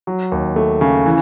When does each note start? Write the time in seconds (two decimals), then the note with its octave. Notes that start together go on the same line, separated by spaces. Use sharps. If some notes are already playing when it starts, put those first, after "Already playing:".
0.07 F#3
0.32 D#2
0.56 A3
0.81 C#3
1.06 E3